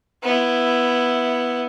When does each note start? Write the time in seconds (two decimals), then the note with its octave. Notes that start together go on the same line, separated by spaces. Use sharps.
0.23 B3 E4